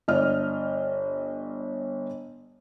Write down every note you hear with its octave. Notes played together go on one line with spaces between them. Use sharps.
G1 D5 D#5 F6